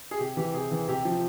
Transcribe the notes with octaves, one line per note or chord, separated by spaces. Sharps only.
G#4
C3 G4
E3 G4
C3 G#4
E3
C3 G4
F3